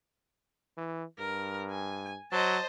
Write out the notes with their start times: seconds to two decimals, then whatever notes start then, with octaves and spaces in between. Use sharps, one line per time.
0.77 E3
1.19 G2 A#4
1.71 G#5
2.32 F#3 C5 D#5 A5